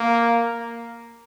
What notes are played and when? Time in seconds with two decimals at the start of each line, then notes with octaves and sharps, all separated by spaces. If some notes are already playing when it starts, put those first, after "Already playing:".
Already playing: A#3